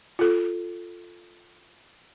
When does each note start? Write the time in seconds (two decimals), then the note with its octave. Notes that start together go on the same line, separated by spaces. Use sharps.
0.19 F4 A4